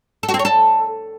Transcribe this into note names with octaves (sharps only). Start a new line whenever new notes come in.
A4
F#4
C4
C#5
A4